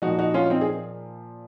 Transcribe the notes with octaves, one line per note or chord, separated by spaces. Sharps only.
A#2 F3 D#4 F#4
D#4 F#4
C#4 F4
C4 D#4
G#4